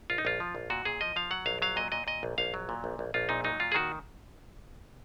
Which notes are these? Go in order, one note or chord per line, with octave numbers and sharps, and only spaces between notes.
A#1 F4
D#4
A#1 F4
F3
A#1
A#2 F#4
A#2 G#4
F3 D#5
F3 F5
F#3 F#5
A#1 F5
F#3 F5
A#2 D#5
A#2 D#5
A#2 D#5
A#1
A#1 F5
F#3
A#2
A#1
A#1
A#1 F4
A#2 D#4
F#3 D#4
A#2 F4
G#4
D#3 F#4